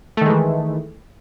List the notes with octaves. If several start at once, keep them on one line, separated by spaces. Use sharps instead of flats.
D#3 E3 G#3 A3